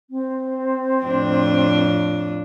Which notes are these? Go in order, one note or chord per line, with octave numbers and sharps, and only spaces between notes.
C4
F2 A2 D4